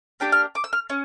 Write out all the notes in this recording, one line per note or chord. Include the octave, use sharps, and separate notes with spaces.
A#3 D4 G4 G5
F6
D6
E6
F6
C#4